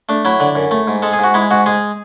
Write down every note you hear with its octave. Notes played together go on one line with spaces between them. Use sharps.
A3 D4
F#3 E4
D3
F#2
A3
G#2
G#3 A4
G#4
G#2 F#4
G#3 E4
G#2 F#4
G#3 G#4